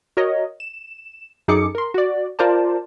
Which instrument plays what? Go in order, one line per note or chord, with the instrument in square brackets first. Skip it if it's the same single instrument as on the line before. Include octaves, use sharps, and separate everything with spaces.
[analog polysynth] F#4 A#4 C#5 D#5
E7
F#2 D#4 G#4 A4 D6 C#7
A#4 C6
F#4 D5
F4 A#4 C5 D5 A5